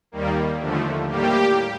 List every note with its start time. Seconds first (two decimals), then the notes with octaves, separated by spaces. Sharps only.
0.12 D#2 D#3 G3 A#3
0.60 D#2 D3 F3 A3
1.08 A2 G3 A#3 G4